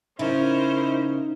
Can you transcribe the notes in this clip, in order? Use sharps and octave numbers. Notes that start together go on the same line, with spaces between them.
C#3 C#4 D#4 E4 A#4 C5